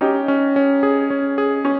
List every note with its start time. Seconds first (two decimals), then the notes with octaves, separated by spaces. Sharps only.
0.01 C#4 D#4 G4
0.28 C#4
0.56 C#4
0.83 G#4
1.10 C#4
1.38 G#4
1.65 C#4